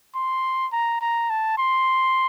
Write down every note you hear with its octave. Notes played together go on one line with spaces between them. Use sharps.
C6
A#5
A#5
A5
C6